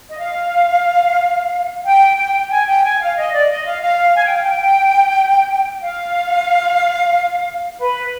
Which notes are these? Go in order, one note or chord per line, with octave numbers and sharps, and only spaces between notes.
D#5
F5
G5
G5
G#5
G5
G#5
F5
D#5
D5
D#5
F5
F5
G#5
G5
F5
G5
F5
B4